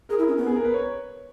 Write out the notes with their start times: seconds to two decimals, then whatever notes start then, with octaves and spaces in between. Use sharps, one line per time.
0.09 G#4 A#4
0.19 E4
0.28 C#4
0.37 B3
0.47 G#4
0.56 A#4
0.64 B4
0.74 C#5